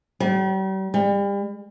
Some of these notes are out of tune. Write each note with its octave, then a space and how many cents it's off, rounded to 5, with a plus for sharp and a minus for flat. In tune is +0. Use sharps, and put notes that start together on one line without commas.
G3 -40
G3 +35